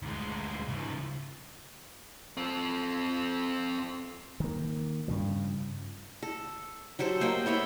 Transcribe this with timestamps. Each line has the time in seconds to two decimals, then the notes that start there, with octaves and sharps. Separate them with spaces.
0.03 D2 G#3
0.69 C#3 F3
2.37 F3 C4
4.40 D#3 A#3
5.08 G2 C#3 F3
6.23 A4
6.99 F#3 G4 A4 C5
7.21 A#3 C5 D#5 G5
7.46 B3 C#5 E5 G5